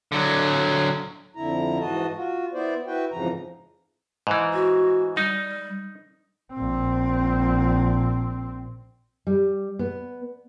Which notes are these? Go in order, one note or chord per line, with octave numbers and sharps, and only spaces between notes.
D3 F#3
F2 D3 E4 A#5
G#2 E3 F#4 D#5 A5
F4 F#4
B3 E4 C5 D5
E4 F#4 B4 G5
F2 G#2 C#3 E3 F3 A#5
G#2 E3
F#4
G3 D#4
A#1 C4
G3
B3